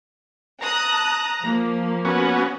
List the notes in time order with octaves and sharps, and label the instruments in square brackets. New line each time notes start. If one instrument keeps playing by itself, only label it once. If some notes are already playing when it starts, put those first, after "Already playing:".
[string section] A5 D#6 F#6 [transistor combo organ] A#5
[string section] F3 A#3
[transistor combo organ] B3 C#4 F#4